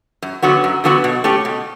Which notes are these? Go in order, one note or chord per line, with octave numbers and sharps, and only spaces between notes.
F#2
D3 F#3 B3 F#4
F#2
D3 F#3 B3 F#4
B2
A3 C#4 G4
B2